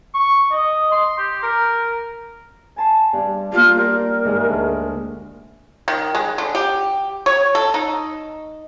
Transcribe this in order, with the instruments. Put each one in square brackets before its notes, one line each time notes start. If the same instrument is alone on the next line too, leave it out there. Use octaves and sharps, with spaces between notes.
[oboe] C#6
D#5
C6
G4
A#4
[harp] G#5 A5 C6
G2 G3
[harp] G3 A#3 [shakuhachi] F4
[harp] G4 D5 G6 [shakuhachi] A#4
[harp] G#2 E3 G#3
D2
[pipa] D#3
G#3
D3
G4
C#5
A4
D#4